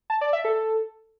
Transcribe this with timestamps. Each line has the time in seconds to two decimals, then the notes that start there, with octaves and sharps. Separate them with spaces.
0.10 A5
0.21 D5
0.33 E5
0.45 A4